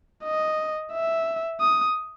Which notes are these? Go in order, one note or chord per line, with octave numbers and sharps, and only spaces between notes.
D#5
E5
D#6